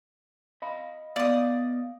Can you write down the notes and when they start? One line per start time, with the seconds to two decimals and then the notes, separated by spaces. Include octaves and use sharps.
0.62 D#5 F5 B5
1.16 B3 D5 D#5 F5 D#6